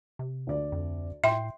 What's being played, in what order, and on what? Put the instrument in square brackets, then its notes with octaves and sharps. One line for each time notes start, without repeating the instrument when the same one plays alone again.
[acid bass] C3
[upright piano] D2 D5
[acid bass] F2
[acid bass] A2 [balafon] E5 [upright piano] G5 C6